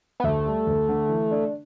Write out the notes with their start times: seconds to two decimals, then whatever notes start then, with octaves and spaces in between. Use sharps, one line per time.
0.20 B3
0.24 D2 A3
0.46 G3
0.67 D2
0.89 D3
1.09 E3
1.31 D4